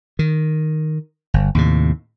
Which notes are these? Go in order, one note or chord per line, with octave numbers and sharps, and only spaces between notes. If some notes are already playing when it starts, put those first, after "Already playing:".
D#3
G1
D#2 A2 C3